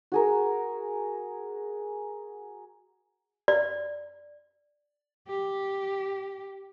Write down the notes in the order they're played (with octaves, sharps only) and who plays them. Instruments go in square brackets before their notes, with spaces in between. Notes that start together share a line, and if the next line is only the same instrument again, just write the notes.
[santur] F#4 G#4 A#4
[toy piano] D5
[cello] G4